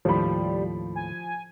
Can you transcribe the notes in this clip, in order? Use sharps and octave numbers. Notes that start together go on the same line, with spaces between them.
D#2 A2 F3 G3 B5
G#5